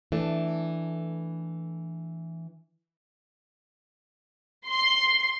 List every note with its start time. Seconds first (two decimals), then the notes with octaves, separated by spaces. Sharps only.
0.12 E3 A3 D4
4.68 C6